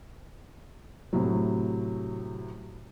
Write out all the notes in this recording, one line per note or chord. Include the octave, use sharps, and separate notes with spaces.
A2 C3 F#3